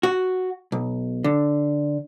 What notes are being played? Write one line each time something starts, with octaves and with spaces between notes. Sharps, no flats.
F#4
B1
D3